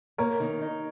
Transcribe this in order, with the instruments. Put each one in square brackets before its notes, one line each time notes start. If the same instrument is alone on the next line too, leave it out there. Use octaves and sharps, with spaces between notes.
[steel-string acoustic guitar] A#3 [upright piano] A#4 C#5
[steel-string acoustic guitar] D#3
D#4